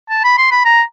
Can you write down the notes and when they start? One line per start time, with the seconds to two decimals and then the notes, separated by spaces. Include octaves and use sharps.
0.10 A5
0.24 B5
0.38 C6
0.51 B5
0.66 A#5